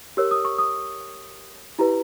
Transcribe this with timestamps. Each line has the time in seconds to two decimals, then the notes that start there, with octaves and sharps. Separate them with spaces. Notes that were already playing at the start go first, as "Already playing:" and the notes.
0.17 G4 A#4 C#5 E6
0.31 D#6
0.45 C#6
0.59 D#6
1.79 E4 G4 B4 A#5